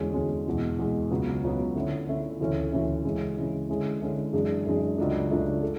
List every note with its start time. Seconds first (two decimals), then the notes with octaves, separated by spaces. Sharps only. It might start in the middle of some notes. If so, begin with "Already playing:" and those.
Already playing: E2 D3 G#3 C#4 F#4
0.13 E2 D3 G#3 C#4 F#4
0.46 E2 B2 G#3
0.79 E2 B2 G#3
1.10 C#2 C#3 F#3 B3
1.43 C#2 C#3 F#3 B3
1.76 D3 A3 C#4 E4
2.07 D3 A3 C#4 E4
2.40 D2 C#3 E3 A3 C#4
2.72 D2 C#3 E3 A3 C#4
3.04 C#3 E3 G#3 C#4
3.37 C#3 E3 G#3 C#4
3.69 D3 G#3 C#4 E4
4.01 D3 G#3 C#4 E4
4.33 F#2 E3 G#3 D4 G#4
4.66 F#2 E3 G#3 D4 G#4
4.98 C#2 C#3 F#3 A3 D4
5.30 C#2 C#3 F#3 A3 D4
5.62 A4